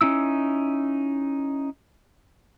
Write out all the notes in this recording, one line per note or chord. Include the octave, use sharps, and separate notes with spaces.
C#4 D#4 E4 E6